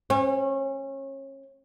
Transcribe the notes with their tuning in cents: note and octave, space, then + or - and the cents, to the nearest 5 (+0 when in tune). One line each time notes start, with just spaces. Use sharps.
C#4 -30